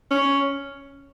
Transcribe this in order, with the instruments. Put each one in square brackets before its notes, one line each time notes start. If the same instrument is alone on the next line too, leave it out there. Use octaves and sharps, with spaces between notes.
[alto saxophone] C#4